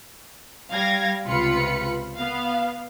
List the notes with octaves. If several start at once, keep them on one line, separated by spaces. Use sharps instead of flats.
G3 F5 G#6 A#6
C#2 C3 F4 B4 B5 C#7
B3 F5